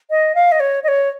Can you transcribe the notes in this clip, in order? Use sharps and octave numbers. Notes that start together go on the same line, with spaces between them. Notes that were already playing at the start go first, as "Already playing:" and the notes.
D#5
F5
D#5
C#5
D#5
C#5